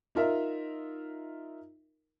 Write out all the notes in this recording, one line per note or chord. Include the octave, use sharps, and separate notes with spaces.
D#4 F4 A#4 E5